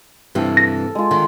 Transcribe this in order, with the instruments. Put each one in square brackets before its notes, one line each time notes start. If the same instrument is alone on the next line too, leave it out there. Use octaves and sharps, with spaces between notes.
[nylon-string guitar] G2 C3 E3 [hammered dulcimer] A4 F5
[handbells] A#6
[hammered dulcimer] G#3 F4
[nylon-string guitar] D3 D#3